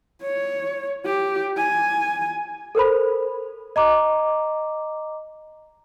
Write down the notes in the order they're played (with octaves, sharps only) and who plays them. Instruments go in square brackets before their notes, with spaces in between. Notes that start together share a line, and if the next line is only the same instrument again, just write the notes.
[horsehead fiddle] C#5
G4
G#5
[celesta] A4 A#4 C5 B5
D#5 A#5 D6